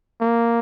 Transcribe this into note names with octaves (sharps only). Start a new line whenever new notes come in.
A#3